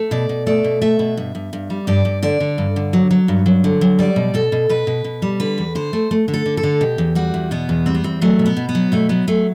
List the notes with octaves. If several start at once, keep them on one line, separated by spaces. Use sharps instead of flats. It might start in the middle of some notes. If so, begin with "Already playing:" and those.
Already playing: A3
B2 D5
B2
A3 D5
B2
A3 E5
B2
G2
G2
G2
G3
G2 D5
G2
D3 D5
D3
G2
D3
F#3
F#3
G2
F#3
D3
F#3
G3 D5
B2
B2 A4
B2
B2 B4
B2
B2
G3
D3 B4
E2
D3 C5
A3
A3
D3
A4
D3
A4
D3
B2 G4
E2
G3 F#4
E2
B2 B3
E2
G3 C4
B3
E2 C4
F#3 A3
B2
B3
B2
B3
F#3
B2 A3
F#3 B3
F#3 A3